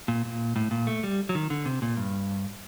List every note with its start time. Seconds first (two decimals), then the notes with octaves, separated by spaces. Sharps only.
0.08 A#2
0.25 A#2
0.56 A2
0.71 A#2
0.87 A3
1.03 G3
1.29 F#3
1.35 D#3
1.50 D3
1.65 C3
1.82 A#2
1.97 G2